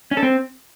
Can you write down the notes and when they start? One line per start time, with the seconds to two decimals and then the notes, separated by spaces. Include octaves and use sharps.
0.11 C#4
0.17 A4
0.23 C4